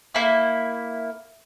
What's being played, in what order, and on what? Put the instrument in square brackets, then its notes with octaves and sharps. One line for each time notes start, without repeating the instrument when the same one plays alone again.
[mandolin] A#3 E4